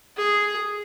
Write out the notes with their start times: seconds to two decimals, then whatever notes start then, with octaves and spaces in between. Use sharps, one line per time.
0.17 G#4